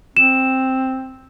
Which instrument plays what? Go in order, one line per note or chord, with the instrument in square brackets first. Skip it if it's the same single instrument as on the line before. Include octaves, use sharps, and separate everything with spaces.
[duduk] C4 [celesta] E7